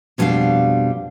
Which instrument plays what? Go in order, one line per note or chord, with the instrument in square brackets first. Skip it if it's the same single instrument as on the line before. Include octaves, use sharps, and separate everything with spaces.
[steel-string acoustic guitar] F2 B2 F#3 G3 D4 F5